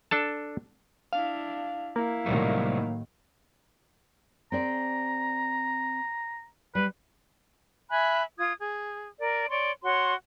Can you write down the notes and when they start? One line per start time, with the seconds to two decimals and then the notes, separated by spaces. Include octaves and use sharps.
0.11 D4 A4 A5
1.13 D4 E4 F5
1.96 A#3 E4 F5
2.26 A2 C3 D#3 F#3 G3 A3
4.52 C4 G#4 D5 A#5
6.75 G3 B4
7.90 E5 G#5 B5 F#6
8.39 F4 D#6 G#6
8.60 G#4
9.19 A#4 D5
9.49 C#5 D5 C6
9.84 F#4 C#5 C6